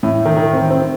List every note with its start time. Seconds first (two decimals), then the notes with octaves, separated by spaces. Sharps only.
0.03 A2
0.25 D#3
0.37 D#3
0.54 C4
0.70 C4